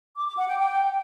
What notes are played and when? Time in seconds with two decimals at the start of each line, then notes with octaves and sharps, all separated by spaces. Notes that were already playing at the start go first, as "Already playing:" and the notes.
0.16 D6
0.27 D6
0.37 F#5
0.47 G5
0.58 G5